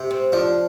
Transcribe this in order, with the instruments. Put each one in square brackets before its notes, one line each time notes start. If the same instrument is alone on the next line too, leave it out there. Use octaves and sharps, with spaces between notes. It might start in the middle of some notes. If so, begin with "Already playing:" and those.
Already playing: [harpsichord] C3
[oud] C4
[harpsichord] F3 [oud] D4